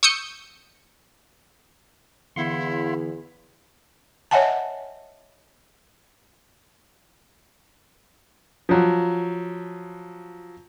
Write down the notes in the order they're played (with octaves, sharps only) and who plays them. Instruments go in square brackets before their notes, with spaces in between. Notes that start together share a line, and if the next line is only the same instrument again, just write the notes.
[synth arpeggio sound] C#6 D#6 E6 G6 C#7
[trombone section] E2 [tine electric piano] D3 E3 B3 [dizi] E4 [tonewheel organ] F5 F#5 C6
[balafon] C#5 D#5 E5 F#5 G#5 A5
[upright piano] F3 F#3